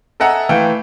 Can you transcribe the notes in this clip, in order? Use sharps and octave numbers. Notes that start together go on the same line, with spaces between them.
A4 D#5 E5 F#5 G#5 A#5
E3 A3 F5 G5